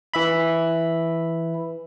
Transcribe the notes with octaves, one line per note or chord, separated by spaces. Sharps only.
E3 E5 B5